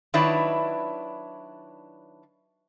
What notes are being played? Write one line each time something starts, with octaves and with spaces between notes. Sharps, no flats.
D#3 F#3 D4 E4 B4 C#5